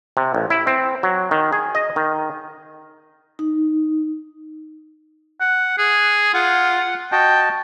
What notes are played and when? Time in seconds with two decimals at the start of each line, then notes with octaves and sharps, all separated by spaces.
0.17 C3
0.35 A1
0.50 E4
0.67 C4
1.03 F#3
1.31 D#3
1.53 G#4
1.75 D#5
1.96 D#3
3.39 D#4
5.41 F#5
5.78 G#4
6.34 F4 F#5
7.12 F#4 D#5 G5 A5